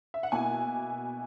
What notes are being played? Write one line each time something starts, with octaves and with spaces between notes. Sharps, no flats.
E5
F#5
B2 A#3 E4 G#5